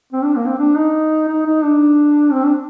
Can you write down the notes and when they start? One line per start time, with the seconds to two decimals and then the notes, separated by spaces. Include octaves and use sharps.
0.13 C4
0.23 D4
0.36 A#3
0.47 C4
0.59 D4
0.76 D#4
1.28 D#4
1.46 D#4
1.63 D4
2.32 C4
2.45 D4